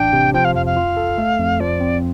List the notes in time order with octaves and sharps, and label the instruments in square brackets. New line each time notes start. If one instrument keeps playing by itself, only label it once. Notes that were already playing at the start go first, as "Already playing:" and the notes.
Already playing: [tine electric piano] A1 D4 [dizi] G5
[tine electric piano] C3
[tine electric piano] F3 [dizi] G5
[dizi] F5
[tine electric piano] F2 [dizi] F5
[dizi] F5
[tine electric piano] F4
A4
A3
F2
[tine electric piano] F3 [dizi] D5
[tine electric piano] C4